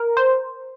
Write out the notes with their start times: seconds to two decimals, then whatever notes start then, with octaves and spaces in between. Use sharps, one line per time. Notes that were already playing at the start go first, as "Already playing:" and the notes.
Already playing: A#4
0.17 C5